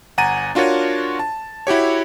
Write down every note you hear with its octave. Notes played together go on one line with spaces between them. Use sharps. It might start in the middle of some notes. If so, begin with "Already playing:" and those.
G1 F#5 G#5 A#5 A6 D#7
D4 F4 F#4 A#4 C#5
A5
E4 F#4 G4 C#5